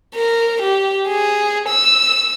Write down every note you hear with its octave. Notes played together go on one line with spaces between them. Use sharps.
A#4
G4
G#4
E6